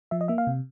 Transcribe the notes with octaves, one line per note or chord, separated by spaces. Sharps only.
F3 E5
D#5
A#3 E5
F5
C3